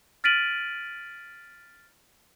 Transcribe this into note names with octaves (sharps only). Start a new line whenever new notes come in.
F6 A6 B6 D7 D#7 F#7